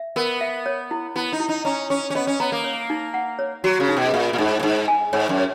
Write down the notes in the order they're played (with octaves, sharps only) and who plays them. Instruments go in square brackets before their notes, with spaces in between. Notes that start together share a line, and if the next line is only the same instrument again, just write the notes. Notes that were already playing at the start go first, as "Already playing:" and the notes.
Already playing: [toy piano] E5
[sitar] B3 [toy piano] A#4
[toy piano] E5
C#5
E4
[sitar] B3 [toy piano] E4
[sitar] D#4
[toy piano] E4
[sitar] D#4
[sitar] C#4 [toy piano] A#5
[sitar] C#4 [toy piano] C#6
[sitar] C#4
[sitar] B3 [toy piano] D#5
[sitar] C#4
[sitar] B3 [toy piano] A#5
[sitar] A#3
[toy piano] C#5
D#4
F#5
C#5
[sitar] F#3 [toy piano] F#4
[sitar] C#3
[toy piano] D#4
[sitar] B2
[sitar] A#2 [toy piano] E5
[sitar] A#2
[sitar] G#2 [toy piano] D#4
[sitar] A#2
[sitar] G#2 [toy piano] D#4
[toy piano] G#5
[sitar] G#2 [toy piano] C#5
[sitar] F#2
[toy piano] C#5